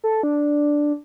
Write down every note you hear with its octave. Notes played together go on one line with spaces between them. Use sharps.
A4
D4